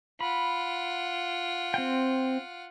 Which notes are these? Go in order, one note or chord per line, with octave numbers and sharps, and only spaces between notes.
F4 F#5 B5
C4 G5